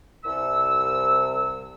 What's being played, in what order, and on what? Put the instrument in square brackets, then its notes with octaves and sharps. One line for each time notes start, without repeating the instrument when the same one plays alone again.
[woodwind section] C2 E6